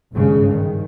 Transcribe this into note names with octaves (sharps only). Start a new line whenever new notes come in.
G#1 G2 C#3 G#3
D#3